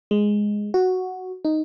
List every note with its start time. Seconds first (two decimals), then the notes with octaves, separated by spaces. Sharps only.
0.11 G#3
0.74 F#4
1.45 D#4